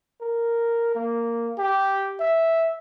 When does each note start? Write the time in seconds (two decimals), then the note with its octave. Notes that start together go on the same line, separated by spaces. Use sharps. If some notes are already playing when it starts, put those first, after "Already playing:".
0.21 A#4
0.95 A#3
1.59 G4
2.20 E5